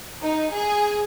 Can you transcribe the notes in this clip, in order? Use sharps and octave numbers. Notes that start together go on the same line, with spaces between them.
D#4
G#4